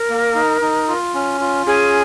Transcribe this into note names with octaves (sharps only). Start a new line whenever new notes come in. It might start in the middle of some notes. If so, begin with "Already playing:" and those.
Already playing: A#4
A#3
D#4
D#4
F4
C#4
F4
C#4 G#4